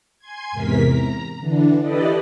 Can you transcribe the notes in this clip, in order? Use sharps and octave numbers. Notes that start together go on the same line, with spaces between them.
G#5 C6 G#6
E2 G#2 C3 E3 A#4 B6
A#5
D3 E3 D4
E4 G4 A4 B4 D5 D#5